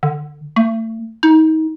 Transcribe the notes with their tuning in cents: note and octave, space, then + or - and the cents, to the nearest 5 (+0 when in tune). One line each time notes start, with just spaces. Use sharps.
D3 +15
A3 +35
D#4 +30